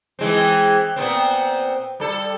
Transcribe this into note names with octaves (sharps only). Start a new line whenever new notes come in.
E3 G#3 C4
A#2 B3 C4
G3 A4